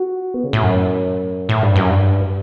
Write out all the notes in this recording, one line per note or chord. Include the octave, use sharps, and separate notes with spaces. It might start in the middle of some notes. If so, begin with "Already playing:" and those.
Already playing: F#4
B3
C#3
A2
F#2
A2
G2
F#2
G2